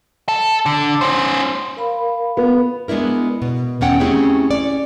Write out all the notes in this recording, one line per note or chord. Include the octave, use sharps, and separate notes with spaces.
A4
D3
C#4 C5
A#4 F5 B5
B3
G#3 B3 D4 E4 A#4
B2
E2 D#3 C#4 F#5 G5
A3 C4 C#4 E4 G4 G#4
C#4 D5